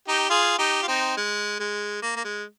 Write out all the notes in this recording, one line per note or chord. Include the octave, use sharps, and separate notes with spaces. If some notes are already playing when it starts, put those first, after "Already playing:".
D#4 G4
F4 G#4
D#4 G4
F4
C4 D#4
G#3
G#3
A#3
A#3
G#3